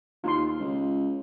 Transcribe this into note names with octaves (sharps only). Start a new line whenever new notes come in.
D#2 F4 C6
C#2